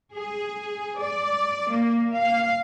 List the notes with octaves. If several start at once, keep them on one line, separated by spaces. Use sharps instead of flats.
G#4
D5
A#3
F5